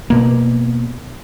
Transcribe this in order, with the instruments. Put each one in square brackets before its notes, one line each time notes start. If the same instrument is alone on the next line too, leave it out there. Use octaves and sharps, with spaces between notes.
[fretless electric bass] B2 A#3